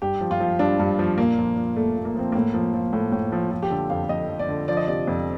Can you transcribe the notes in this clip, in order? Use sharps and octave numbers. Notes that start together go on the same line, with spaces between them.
G2 G4
F3
F4
F3
G2 D4
G2
F3
A#2 A#3
F3
F3
A#2 A3
A#2
A#3
F3 C4
A2 A#3
F3
F3
A2
A2
F3
F3
G4
D3 A4
F2 F5
F2 D#5
F3
D5
D3
F3 D5
D#5
C3 D5
F2